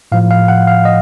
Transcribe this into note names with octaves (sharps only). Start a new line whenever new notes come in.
A2 F3 F5
F5
F#5
F5
D#5